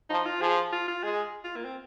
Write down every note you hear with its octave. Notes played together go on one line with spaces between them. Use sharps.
F3 D#4
F4
F3 G#4
F4
F4
G#3 G#4
F4
A#3
C4